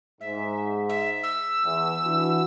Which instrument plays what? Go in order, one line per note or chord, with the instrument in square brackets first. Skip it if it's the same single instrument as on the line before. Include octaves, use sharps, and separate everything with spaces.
[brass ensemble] G#2 [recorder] E5
[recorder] E5
E6
[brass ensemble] E2
E3 D4 F#4